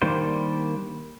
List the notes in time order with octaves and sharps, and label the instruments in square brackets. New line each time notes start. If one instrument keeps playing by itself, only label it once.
[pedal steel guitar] D#3 G3 A#3 D4 C5